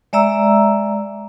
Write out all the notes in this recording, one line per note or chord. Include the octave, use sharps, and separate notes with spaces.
G#3 D5 E5 A#5 E6